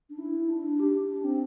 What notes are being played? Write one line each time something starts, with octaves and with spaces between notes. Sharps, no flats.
D4
E4
D4
G4
D4
C4